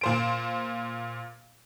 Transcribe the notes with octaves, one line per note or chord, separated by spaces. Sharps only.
A#2 C5 D7